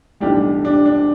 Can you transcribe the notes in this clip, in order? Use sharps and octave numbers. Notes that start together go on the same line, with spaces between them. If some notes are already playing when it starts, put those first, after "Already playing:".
B1 A2 E3 G3 D4 G4
D4 G4
D4